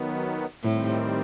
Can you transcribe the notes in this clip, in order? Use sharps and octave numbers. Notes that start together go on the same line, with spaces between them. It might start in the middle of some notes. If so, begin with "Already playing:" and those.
Already playing: D#3 F#3 B3
A2 D#3 G3 C4